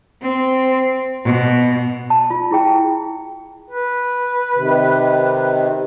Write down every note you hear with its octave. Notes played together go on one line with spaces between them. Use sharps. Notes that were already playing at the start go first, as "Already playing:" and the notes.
C4
B2
A5
F4
E4 G#4 G5
B4
C3 D#3